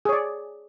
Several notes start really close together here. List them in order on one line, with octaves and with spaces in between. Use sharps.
G#4 C#5 D5